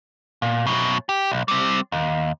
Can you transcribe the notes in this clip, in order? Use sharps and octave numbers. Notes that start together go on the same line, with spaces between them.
A#2
F#2 B2
G4
B1
G3 C4
D#2